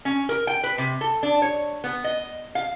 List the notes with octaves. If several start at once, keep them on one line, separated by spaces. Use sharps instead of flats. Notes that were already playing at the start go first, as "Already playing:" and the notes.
C#4
A#4
G5
B4
C3
A4
D4
C#5
B3
D#5
F5